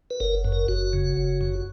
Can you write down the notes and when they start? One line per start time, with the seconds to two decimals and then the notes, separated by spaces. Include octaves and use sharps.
0.10 B4
0.20 F#1 A#4
0.45 F#2
0.52 A#4
0.68 F#1 F#4
0.93 C#3
1.17 F#1
1.41 F#2